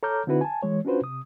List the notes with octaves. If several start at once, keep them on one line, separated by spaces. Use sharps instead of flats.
A4 C#5 A#5 D6 F6 G6
D3 C4 D#4 E4 F#4 B4
G#5 A5
E3 G#3 C#5
C#4 D4 F4 F#4 B4 C5
C3 D#6